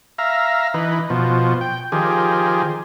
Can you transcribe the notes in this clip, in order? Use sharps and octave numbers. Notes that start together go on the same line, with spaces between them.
E5 F5 A#5
E3 D#4 B4
B2 F3
G5
D#3 F3 G4 G#4